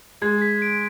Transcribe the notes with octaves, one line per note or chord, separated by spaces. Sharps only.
G#3 G#6
B6
D7